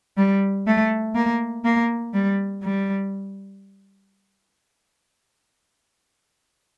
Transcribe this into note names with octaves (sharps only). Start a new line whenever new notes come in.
G3
A3
A#3
A#3
G3
G3